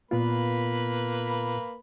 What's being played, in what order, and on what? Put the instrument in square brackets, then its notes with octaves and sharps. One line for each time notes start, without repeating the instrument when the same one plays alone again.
[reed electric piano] A#2 B3 F4 [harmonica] A#3 B4 B5